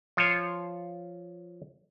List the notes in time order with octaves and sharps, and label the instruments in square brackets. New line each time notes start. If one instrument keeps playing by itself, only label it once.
[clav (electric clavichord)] F3 F4 C5 C#5